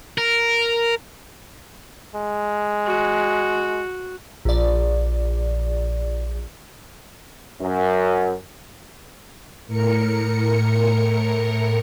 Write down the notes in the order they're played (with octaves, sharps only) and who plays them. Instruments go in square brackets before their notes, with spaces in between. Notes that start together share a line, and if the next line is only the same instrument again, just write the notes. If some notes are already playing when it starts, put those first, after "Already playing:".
[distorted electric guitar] A#4
[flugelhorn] G#3
[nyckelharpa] F#4
[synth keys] A#1 D5
[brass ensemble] F#2
[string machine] A2 A#4 C#7